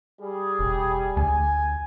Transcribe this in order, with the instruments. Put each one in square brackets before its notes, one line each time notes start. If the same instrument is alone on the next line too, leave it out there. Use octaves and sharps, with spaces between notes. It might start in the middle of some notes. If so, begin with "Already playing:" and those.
[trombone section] G3 G#4
[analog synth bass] E1
[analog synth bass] D2 [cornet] G#5